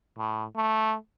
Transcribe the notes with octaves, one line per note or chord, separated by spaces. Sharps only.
A2
A3